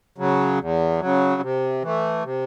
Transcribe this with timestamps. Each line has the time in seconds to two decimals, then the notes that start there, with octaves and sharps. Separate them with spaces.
0.18 C#3 F#3
0.59 E2
1.00 C#3 F#3
1.42 C3
1.82 E3 A3
2.24 C3